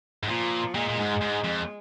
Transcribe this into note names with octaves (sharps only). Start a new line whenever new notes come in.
G#2
A#2 F3
A#2 G#3
A#2
G#2
G#2
F2